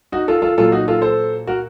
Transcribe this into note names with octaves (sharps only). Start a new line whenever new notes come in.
D#4 F#4
F4 A4
F4 A4
A#2 F#3 F4 A4
D#4 F#4
F4 A4
A4 C5
F#4 A#4